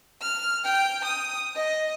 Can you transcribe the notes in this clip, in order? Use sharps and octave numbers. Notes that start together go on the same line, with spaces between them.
F6
G5
D#6
D#5